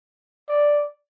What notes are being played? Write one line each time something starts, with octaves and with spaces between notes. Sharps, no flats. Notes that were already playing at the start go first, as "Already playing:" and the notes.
D5